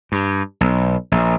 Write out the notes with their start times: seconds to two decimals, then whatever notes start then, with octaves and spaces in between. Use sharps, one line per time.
0.12 G2
0.61 B1
1.12 A#1